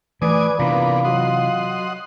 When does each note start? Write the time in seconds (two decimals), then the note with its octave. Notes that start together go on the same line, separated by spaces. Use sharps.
0.22 E3 A3 B4 D5 G#5 D6 D#6
0.59 C3 E3 A#3 B3 D4 F4
1.05 F#3 D#5 F#5 C6